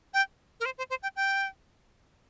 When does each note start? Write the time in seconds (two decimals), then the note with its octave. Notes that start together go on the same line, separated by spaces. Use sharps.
0.14 G5
0.60 A#4
0.65 C5
0.78 C5
0.90 C5
1.03 G5
1.16 G5